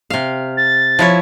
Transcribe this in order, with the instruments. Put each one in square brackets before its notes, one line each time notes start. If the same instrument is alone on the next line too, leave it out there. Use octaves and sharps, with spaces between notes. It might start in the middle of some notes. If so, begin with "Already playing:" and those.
[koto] C3 F5
[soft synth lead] A6
[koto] F3 E4 C#5